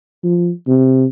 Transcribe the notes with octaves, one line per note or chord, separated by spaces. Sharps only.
F3
C3